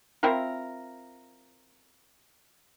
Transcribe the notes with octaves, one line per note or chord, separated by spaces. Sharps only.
C4 E4 F4 A#4